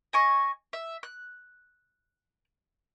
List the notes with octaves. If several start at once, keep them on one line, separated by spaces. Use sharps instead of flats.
D#5 G#5 C#6
E5
F#6